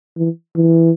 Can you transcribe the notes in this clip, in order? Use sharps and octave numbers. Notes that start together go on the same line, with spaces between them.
E3
E3